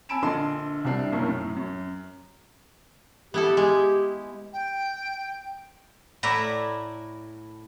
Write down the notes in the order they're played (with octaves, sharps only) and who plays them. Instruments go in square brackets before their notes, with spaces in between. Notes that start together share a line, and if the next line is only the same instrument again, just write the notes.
[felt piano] G#5 A5 B5 E6 D7 E7
A#1 D3 A4 D#5 C6
C2 C3 D4 C7
B1 F#2 A2 A#3
F#2 A2
F#2
[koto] B3 E4 A4 [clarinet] G4
[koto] G#3
[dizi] G5
[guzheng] A2 E4 D5 E5 A#5